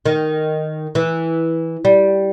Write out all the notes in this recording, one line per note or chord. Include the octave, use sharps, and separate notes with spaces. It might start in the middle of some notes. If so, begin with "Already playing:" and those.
D#3
E3
G3